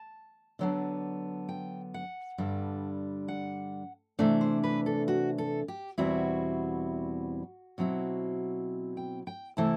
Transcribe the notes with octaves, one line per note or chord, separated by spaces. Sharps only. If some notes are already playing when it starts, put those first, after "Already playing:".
Already playing: A5
D3 F#3 B3 D4
G5
F#5
G2 D3 G3 D4
F#5
C3 E3 A3 D4
C5
B4
A4
F#4
A4
G4
E2 B2 G3 C4 E4 F#4
B2 F#3 C4 E4
G5
G5
C3 E3 A3 E4 A5